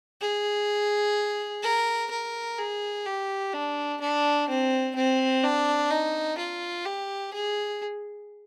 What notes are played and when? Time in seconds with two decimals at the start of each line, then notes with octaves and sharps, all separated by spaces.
0.21 G#4
1.63 A#4
2.11 A#4
2.58 G#4
3.06 G4
3.53 D4
4.01 D4
4.49 C4
4.95 C4
5.43 D4
5.91 D#4
6.38 F4
6.85 G4
7.33 G#4